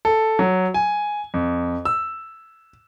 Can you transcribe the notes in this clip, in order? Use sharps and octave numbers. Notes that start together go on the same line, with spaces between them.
A4
F#3
G#5
F2
E6